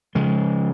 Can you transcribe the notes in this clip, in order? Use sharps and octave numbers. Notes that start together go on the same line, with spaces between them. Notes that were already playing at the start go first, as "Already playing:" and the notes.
C#3 F3 G#3